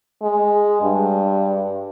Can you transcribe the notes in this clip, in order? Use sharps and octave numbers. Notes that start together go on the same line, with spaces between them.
G#3
G2